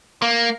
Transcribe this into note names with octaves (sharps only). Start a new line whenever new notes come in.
A#3